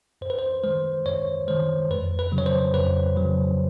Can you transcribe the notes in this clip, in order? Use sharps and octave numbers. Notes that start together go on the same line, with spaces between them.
F#2 C5
B4
C5
D#3 G#3 C5
F#2 C#5
D#3 G#3 C5
F2 B4
B4
C#3 F#3
C#5
C5
F2 B4
C#3 F#3